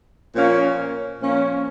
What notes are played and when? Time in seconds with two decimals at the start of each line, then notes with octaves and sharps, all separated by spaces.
0.34 A#2 F3 A#3 C#4
1.20 A#2 F3 A#3 C#4